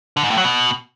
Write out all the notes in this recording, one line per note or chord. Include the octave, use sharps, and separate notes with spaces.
D3
G#2
A2
F#3
B2